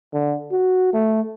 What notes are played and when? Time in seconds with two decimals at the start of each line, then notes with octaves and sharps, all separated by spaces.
0.13 D3
0.52 F#4
0.94 A3